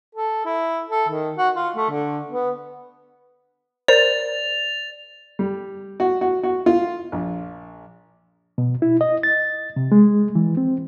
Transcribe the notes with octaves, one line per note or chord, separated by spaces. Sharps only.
A4
E4
A4
D#3
F#4
F4
A3
D3
B3
A#4 C5 D5 A6 F7
G3
F#4
F#4
F#4
F4
A#1
B2
E4
D#5
A6
C3
G#3
E3
C4